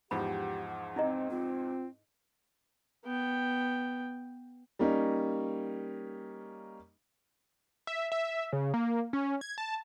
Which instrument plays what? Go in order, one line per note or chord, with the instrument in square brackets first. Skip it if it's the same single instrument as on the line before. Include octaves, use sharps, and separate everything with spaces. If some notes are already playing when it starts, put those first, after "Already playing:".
[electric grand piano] E2 G#2 F3 [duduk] G4 [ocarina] F#5 [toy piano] B5
[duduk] C4 [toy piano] D#4 E4 D#5
[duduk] C4 [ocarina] F4
[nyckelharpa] B3 G5
[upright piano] G3 A#3 C#4 D#4
[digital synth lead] E5
E5
C#3
A#3
C#4
G#6
A5